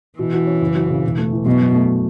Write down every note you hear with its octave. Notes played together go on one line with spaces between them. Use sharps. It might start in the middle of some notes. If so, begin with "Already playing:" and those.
B2 E3
F#4
C#4
F#1
F#3
C#3
E1
A3
E3
F#2 B2
F#2
A3